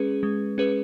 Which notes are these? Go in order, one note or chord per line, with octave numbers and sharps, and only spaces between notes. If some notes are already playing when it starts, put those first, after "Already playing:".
Already playing: G#3 C#4 G#4 B4
G#3
C#4 G#4 B4